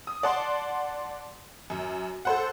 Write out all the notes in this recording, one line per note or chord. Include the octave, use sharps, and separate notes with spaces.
D#6
D5 F#5 A5 C6
F#2
A4 C5 F#5